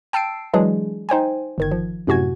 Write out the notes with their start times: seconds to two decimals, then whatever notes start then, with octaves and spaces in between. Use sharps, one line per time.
0.13 G5 A5 E6 C7 D7
0.54 E3 F#3 G#3 D4 G#4
1.09 D#4 C5 G5 G#5
1.58 G1 D#3 G#6
1.71 F3
2.07 F#2 A2 C3 F#4 G#5 G#6